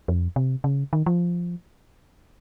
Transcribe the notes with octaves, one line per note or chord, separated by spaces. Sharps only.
F2
C3
C#3
D#3
F3